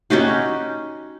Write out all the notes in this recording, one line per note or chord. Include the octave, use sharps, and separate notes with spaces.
C#4 D#4 F#4 G4